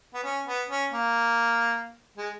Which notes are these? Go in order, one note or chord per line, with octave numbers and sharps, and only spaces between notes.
B3
C#4
B3
C#4
A#3
G#3